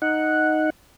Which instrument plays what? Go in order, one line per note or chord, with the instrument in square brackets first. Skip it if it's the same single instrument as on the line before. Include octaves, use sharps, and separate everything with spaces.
[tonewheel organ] D#4 F#5